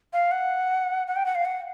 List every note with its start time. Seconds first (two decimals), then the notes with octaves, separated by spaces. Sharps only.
0.13 F5
0.31 F#5
1.07 F#5
1.16 G5
1.26 F#5
1.35 F5
1.45 F#5